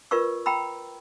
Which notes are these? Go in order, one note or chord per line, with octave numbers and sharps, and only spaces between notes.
F4 A#4 B4 D5 C#6 E6
G5 A#5 B5 E6